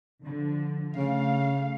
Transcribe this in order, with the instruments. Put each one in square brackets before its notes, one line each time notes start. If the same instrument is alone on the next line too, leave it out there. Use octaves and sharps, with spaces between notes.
[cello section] D3 F3
[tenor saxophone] C#3 [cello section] A3 F5